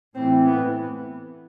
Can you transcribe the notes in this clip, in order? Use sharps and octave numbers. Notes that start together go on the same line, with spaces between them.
A2 E3 C4
B3